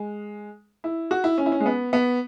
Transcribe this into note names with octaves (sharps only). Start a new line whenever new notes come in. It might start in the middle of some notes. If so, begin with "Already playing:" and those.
Already playing: G#3
E4
F#4
E4
C#4
E4
C#4
G#3
B3
B3